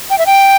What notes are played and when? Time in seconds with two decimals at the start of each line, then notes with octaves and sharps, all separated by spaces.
0.10 G5
0.18 E5
0.26 G5